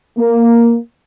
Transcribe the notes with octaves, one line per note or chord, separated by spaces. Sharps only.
A#3